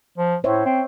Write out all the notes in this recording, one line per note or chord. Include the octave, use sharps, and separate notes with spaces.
F3
A2 C5 C#5 E5
C4